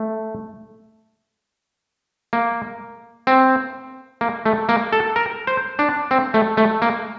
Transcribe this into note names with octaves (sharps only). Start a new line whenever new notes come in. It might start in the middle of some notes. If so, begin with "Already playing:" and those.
Already playing: A3
A#3
C4
A#3
A3
A#3
A4
A#4
C5
D4
C4
A3
A3
A#3